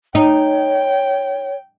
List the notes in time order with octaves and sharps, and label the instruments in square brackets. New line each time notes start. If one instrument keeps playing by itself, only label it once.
[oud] D#4 [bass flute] C#5 [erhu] G5